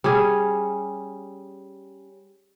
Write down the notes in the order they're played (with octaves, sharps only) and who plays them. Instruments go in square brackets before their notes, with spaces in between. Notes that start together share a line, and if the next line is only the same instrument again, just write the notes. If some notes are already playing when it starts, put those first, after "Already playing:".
[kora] G3 C#4 G#4